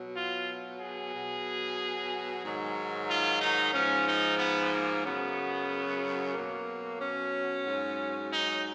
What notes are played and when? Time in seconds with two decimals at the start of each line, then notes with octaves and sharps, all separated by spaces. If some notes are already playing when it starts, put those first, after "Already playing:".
Already playing: B2 F#3
0.15 F4
0.79 G#4
1.12 B2 F#3
2.42 G#2 D#3 F#3
3.08 F4
3.40 D#4
3.73 G#2 F3 C#4
4.06 D#4
4.38 B3
4.71 A#3
5.03 F#2 C#3 F#3 B3
6.33 B2 F#3 A#3
6.99 C#4
7.64 G#2 F#3
8.29 D#4